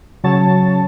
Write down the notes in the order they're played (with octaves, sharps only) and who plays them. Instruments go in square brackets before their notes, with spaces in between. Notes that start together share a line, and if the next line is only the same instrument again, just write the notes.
[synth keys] C#3 F#3 C#5 A5 A6